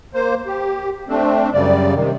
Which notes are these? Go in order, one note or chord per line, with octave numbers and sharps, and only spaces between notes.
A#3 C5
G4
A3 C4 D4
F#2 C#3 G3 D5
C3 D#3